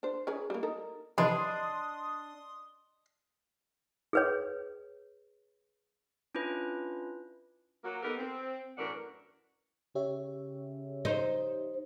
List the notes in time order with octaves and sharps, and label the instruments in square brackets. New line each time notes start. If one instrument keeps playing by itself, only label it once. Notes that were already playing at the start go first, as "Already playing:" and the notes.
[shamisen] D4 C5
C#4 G#4 B4
G3 A#3
D#4 A4 A#4
[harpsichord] C3 E3 [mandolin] D4 [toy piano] D#5 B5 [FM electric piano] C6 D#6
[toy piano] G#4 B4 C#5
[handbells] C#4 D4 E4 F4 B4
[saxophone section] F#3 A#3 F#4
B3 D#4 G4 A4 A#4
C4
F#2 A2 E3 D4 A#4 F#5
[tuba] C#3 [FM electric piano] G4 C#5 E5
[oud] D#4 C5